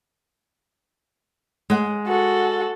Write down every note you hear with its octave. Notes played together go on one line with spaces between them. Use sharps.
G#3 F#5
F#4 A4